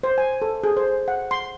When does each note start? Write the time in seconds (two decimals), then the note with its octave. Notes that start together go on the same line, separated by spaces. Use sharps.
0.03 C5
0.18 G#5
0.42 A4
0.64 G#4
0.77 C5
1.08 F#5
1.31 C6